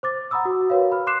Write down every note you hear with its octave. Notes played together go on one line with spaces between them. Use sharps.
C5 D6 A6
F#5 A#5 B5 D#6 E6
F#4
F#4 A#4 B4 C#5 F5
B5 F6
C6 D6 F#6 C7 E7